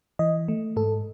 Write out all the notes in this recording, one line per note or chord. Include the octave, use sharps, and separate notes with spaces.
E3 D#5
A3
G#2 A4